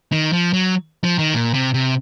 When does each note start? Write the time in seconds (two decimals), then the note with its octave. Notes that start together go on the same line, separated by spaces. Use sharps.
0.12 D#3
0.33 F3
0.53 F#3
1.04 F3
1.19 D#3
1.34 A#2
1.54 C3
1.74 C3